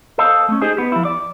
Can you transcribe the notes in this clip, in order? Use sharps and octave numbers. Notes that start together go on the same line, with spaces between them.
A4 C5 D#5 F5 A5
A3 C#4
D#4 G4 G#4 C5 D#5
B3 G4
F3 E4
D5